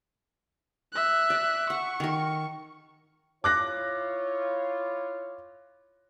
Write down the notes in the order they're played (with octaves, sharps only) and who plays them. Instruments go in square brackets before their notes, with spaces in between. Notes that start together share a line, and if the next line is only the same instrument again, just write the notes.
[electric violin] E5 F#6
[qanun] D5
[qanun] F#5 [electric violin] C#6
[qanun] D#3 A#4
[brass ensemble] E4 F4 C#5 [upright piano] D6 F#6 A#6